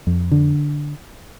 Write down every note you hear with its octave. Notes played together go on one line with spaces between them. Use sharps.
F2
D3